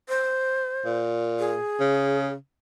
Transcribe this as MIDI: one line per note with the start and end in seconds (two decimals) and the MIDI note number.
0.09 0.97 72
0.85 1.58 46
1.39 2.28 68
1.80 2.34 49